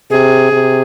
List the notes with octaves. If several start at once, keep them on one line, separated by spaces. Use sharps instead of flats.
C3 G#4
C3